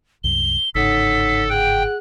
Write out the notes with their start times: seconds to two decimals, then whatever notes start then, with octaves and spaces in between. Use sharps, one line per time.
0.24 C2 F#2 G7
0.75 G1 G#2 C#3 D#4 A4 C#5 F#5 B6
1.50 G#4 F#5 G5 F#6